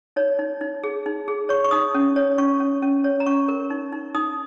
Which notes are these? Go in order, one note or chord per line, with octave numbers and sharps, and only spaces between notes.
D#4 C#5
D#4
D#4
G#4
D#4
G#4
C#5 C#6
C#6
D#4 D#6
C#4
C#5
C#4 C#6
C#4
C#4
C#5
A#5
C#4 C#6
A#4
D#4
D#4
D#4 D#6